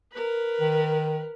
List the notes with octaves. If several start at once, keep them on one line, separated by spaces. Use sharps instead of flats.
A#4 B4
D#3